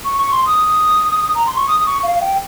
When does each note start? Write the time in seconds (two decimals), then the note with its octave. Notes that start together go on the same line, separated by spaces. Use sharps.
0.05 C#6
0.18 C#6
0.32 C6
0.46 D#6
1.35 A#5
1.46 C6
1.57 C#6
1.68 D#6
1.80 D#6
1.86 C#6
2.03 F5
2.21 G5